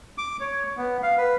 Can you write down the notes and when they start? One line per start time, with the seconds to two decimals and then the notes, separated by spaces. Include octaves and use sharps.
0.18 D6
0.40 C#5
0.77 B3
1.03 F5
1.17 B4